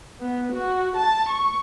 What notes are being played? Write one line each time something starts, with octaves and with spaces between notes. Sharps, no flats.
B3
F#4
A5
C#6